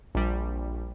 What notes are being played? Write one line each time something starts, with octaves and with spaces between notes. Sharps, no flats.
A#1 G3